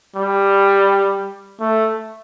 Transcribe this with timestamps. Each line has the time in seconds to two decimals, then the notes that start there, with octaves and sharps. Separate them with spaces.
0.16 G3
1.60 A3